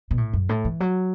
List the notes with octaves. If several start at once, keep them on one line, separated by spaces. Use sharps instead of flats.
B2
A2
F#2
A2
E3
F#3